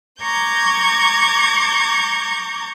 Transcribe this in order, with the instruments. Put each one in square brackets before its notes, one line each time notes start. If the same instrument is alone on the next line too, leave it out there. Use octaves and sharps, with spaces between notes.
[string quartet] A#5 C#6 D6 G6 G#6